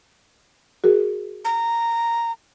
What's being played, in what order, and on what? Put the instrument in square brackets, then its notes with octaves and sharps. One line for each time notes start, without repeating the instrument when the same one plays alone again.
[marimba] F#4 G#4 A#4
[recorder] A#5